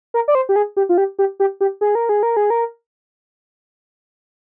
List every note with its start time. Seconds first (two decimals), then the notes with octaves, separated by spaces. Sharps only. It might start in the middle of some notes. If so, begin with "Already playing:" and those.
0.14 A#4
0.28 D5
0.35 C5
0.49 G4
0.56 G#4
0.77 G4
0.89 F4
0.98 G4
1.19 G4
1.40 G4
1.61 G4
1.81 G#4
1.95 A#4
2.09 G#4
2.23 A#4
2.37 G#4
2.50 A#4